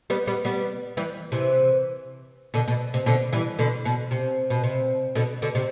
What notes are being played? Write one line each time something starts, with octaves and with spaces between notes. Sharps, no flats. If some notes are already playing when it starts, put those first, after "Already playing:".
G3 B3
G3 B3
G3 B3
E3 G3
C3 E3
B2 D3
B2
C3
B2 D3
E3 G3
B2 D3
B2
C3
B2
C3
B2 D3
B2 D3
C3